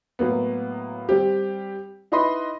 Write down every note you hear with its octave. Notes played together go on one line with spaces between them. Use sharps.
A2 F#3 A#3 B3
G3 C4 G4
D#4 E4 B4 D#5 B5 C6